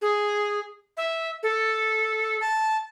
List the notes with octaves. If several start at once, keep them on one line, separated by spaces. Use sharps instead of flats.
G#4
E5
A4
A5